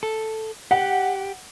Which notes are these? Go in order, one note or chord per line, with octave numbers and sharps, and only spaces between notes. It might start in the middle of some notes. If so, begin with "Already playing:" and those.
A4
G4 F#5